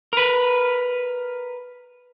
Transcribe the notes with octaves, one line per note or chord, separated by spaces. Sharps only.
A#4 B4